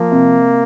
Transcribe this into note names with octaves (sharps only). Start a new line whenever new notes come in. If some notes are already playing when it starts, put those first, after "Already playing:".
Already playing: F3 A#3
C3